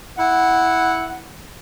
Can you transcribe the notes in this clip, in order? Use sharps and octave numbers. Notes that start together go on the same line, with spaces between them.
E4 F#5